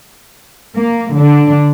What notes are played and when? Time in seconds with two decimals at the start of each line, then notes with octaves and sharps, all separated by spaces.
0.74 A#3
1.15 D3 D4